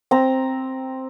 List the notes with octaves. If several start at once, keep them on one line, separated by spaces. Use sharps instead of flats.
C4 A#5